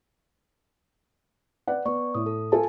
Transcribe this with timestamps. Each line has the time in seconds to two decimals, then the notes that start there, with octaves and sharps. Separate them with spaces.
1.67 B4 D5 F#5
1.85 B3 D5 C#6
2.15 A2 D#6
2.26 A4
2.52 F4 A4 A#4 G#5 A5